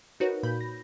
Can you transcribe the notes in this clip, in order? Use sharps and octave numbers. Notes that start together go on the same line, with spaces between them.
D#4 F#4 A#4 B4 C#5
A#2 B5 G6
A#6